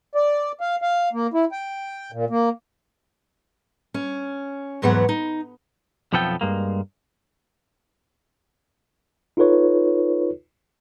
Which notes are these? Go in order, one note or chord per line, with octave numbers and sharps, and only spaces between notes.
D5
F5
F5
A#3
E4
G5
A#2
A#3
C#4
E2 G#2 E3 F#3 B3 F#5
D#4
B1 F2 F3 B3 A4 G5
G2 G#3 A#3
D#4 F4 A4 B4 C#5